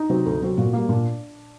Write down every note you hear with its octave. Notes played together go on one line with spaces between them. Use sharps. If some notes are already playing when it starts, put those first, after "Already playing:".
Already playing: D#4
C3 F#3 C4
D2
C3 F#3 C4
A#2 F#4
G3 A#3
A#2 D4